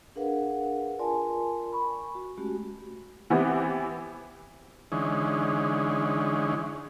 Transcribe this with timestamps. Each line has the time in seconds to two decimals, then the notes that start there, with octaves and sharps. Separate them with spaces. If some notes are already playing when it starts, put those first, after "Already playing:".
0.16 D4 G#4 A#4 B4 F5 F#5
0.99 F4 A#4 D5 G#5 A5 C6
1.73 B5 C#6
2.15 F#4
2.38 G#3 A3 C#4 F#4 G4
3.30 E3 B3 C4 E4 G4
4.92 D3 E3 G#3 C#4 D#4